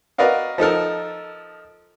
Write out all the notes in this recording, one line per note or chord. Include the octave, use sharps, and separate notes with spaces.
F#4 A#4 B4 D5 D#5 F5
F3 D#4 A4 A#4